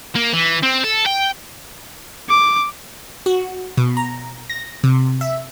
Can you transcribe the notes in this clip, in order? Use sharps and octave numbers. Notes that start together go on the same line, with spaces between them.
A#3
E3
C4
A4
G5
D6
F#4
B2
A#5
A#6
C3
E5